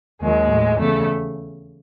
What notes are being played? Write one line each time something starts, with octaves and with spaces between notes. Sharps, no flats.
D#2 D#3 F#3 G#3
A2 F#3
E2 C#3 A3